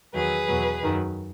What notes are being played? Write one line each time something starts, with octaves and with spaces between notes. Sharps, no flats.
E2 D#3 F#3 G#4 B4
E2 B2 F#3
F#2 D#3 F#3